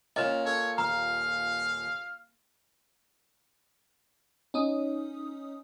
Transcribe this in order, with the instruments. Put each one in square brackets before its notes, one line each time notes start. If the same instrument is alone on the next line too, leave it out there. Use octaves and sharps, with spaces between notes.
[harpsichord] A#2 [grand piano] C#4 F6 E7 [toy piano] D#5
[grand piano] A4 [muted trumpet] C#5
[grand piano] D#1 [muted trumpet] F5 [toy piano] A#5
[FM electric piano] C#4 D#4 D#6